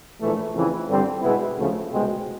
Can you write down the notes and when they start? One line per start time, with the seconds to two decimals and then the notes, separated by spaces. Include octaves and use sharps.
0.20 A#1 A2 E3 A3
0.54 F2 C#3 E3
0.88 G2 D3 G3 C4
1.22 B2 G#3 B3 E4
1.57 D2 C#3 F3 A3
1.91 C2 B2 G#3 C4